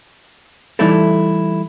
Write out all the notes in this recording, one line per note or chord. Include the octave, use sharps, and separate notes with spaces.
E3 G3 A3 D#4 E4 A4